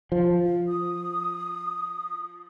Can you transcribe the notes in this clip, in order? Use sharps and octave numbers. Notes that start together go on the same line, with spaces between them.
F3
D#6